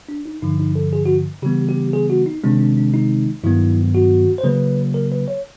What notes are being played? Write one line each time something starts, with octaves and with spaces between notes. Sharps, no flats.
D4
D#4
G2 D3 F3 D#4
D#4
A4
G#4
F#4
C#3 E3 G3 B3 G4
G4
G#4
F#4
D#4
C3 D#3 G#3 C4 D4
D4
D4
D#4
G2 D#3 F#3 B3 E4
F#4
C5
C#3 F#3 A#3 B4
A#4
B4
C#5